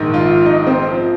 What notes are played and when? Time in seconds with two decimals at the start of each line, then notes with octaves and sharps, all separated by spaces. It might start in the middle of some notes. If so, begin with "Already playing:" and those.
Already playing: A#1 G#2 D#3
0.14 F4
0.46 D#4
0.67 C4
0.89 F3